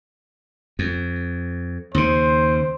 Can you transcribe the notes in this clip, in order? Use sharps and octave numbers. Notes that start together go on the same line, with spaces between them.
F2
D#2 C#3 C5